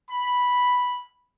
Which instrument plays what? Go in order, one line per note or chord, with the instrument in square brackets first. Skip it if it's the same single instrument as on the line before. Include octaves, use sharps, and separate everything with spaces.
[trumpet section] B5